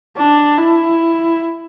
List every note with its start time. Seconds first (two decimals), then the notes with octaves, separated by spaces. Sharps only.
0.17 D4
0.58 E4